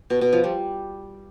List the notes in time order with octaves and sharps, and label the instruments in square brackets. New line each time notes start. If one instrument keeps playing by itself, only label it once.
[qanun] B2
B2
F3
G3